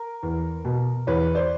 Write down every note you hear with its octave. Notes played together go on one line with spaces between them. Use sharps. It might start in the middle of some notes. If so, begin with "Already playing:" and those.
Already playing: A#4
E2
B2
E2 B4 C#5
C5 D5